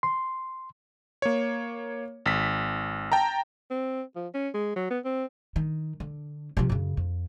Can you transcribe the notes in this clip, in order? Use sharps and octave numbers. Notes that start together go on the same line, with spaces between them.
C6
A#3 C#5
G#1 B6
G5 A5 A#5
C4
F3
C#4
G#3
F#3
B3
C4
D#3
D3
C3 F3
F#2 C#3
F2